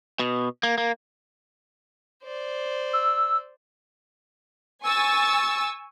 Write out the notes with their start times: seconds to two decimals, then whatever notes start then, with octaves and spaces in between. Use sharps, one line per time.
0.19 B2
0.63 A#3
0.78 A#3
2.23 C5 D5
2.93 E6
4.83 G#5 C#6 E6 A6